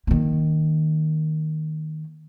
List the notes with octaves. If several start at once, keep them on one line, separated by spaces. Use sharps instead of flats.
D#3 A#3